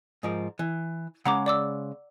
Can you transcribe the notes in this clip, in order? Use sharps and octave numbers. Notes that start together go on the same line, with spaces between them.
G#2 F3 A#4
E3
C#3 G#3 F#5 A#5 B5 D6
D5 D6 E6